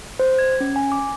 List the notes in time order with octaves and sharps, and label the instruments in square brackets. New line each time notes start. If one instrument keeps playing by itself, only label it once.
[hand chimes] C5
G#6
C#4
G#5
D6